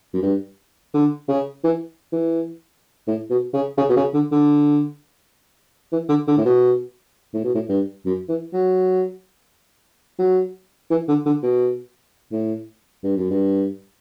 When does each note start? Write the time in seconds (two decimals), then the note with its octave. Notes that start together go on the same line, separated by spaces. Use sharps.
0.14 F#2
0.23 G2
0.94 D3
1.28 C#3
1.64 E3
2.12 E3
3.07 A2
3.30 B2
3.54 C#3
3.77 C#3
3.89 B2
3.96 C#3
4.14 D3
4.32 D3
5.92 E3
6.09 D3
6.28 D3
6.38 A2
6.45 B2
7.34 A2
7.44 B2
7.55 A2
7.69 G2
8.06 F#2
8.29 E3
8.53 F#3
10.19 F#3
10.90 E3
11.08 D3
11.26 D3
11.43 B2
12.32 A2
13.04 G2
13.17 F#2
13.30 G2